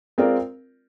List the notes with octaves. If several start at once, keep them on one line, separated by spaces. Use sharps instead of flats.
G#3 C4 F4 A#4 D5